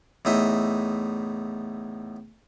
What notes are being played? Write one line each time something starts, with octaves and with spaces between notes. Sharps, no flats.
E2 A2 D#4 E5